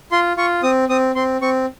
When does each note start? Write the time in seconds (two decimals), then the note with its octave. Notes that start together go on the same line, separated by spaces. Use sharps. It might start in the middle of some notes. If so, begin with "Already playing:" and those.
0.12 F4 C6
0.37 F4 C#6
0.63 C4 D#6
0.89 C4 D#6
1.15 C4 C6
1.41 C4 C#6